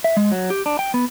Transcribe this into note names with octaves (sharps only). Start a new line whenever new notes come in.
E5
G#3
F#3
G4
D4
G5
B3